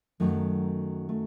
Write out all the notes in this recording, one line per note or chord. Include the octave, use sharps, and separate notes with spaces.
F#2 D#3 F#3 A3
A3